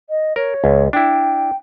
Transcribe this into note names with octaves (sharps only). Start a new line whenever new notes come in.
D#5
A#4 C#5
C#2
D4 E4 G5